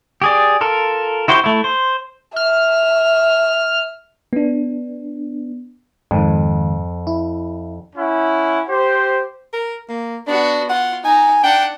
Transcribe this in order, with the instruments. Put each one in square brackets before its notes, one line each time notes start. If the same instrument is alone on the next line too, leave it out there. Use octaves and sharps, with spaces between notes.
[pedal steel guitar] G4 G#4 D5
F4 A4 A#4
E4 F#4 G4 C5
A3 E4
C5
[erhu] E5 [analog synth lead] F6
[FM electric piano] B3 D4
[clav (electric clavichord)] F2 [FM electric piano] G#2 D#3
[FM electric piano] E4
[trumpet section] C#4 E4 F#5
G4 C5
[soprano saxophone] A#4
A#3
[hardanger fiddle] B3 F#4 [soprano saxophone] D4
[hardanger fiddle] F4 [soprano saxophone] F#5
[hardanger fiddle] D#4 A#5 [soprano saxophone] G#5
[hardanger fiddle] D4 F#5 [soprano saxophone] G5